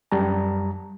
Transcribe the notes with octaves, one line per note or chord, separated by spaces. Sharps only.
F#2 G3 A5 A#5